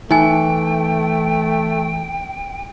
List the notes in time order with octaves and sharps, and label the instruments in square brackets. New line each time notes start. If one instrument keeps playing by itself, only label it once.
[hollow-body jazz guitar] E3 [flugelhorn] A3 [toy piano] D#4 G#5 [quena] G5